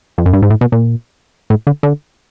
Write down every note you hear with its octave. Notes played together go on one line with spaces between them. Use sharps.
F2
F#2
G2
G#2
A2
B2
A#2
A2
D3
D3